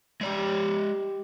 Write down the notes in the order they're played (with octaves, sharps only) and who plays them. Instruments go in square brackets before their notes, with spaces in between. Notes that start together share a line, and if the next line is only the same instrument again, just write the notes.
[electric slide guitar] G#3 D5 [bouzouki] D#4 G4